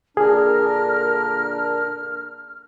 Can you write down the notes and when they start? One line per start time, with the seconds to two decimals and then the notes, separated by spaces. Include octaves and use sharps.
0.17 A#2 D3 D4 G#4 A#4 F6